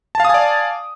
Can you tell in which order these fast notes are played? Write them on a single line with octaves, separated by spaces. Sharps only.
A5 F5 D#6 G#5 D5